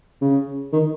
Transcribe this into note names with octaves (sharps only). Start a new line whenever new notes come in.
C#3
D#3